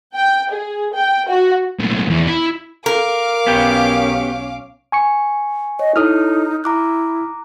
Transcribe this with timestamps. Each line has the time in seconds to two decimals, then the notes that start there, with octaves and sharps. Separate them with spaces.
0.16 G5
0.52 G#4
0.94 G5
1.28 F#4
1.79 B1 A2
2.10 E2
2.27 E4
2.86 A#4 F5 D6
3.47 B1 B3 C#4 G4
4.92 G#5 C#6 C#7
5.79 C#5 D#5
5.96 D#4 E4 A4 C#5 D#6 F6
6.64 E4 A#5 D6 F#6